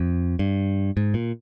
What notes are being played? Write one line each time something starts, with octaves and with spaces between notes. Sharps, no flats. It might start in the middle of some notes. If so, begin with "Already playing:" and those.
Already playing: F2
G2
G#2
A#2